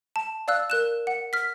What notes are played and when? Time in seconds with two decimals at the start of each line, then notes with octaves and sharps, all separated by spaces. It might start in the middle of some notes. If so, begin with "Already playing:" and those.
0.16 A5
0.48 D5 F5 E6 F#6
0.70 A#4 F#6 E7
1.07 F#5
1.33 F6 B6